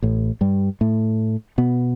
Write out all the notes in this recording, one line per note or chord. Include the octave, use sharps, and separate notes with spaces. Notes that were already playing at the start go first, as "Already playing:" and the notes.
A1 A2
G2 G3
A2 A3
B2 B3